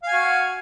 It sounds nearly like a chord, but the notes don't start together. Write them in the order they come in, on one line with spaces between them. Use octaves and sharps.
F5 G#5 F#4